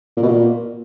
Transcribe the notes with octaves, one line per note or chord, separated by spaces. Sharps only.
A#2
B2
A#2